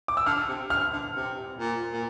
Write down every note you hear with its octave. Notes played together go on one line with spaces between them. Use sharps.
D6
E6
D3 F6
C3
D3 F6
D3
C3
A#2
A#2